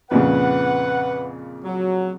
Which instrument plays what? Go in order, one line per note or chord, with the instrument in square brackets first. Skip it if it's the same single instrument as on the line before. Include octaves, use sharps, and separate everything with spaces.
[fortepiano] F2 A#2 C#3 [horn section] B4 F#5
[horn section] F#3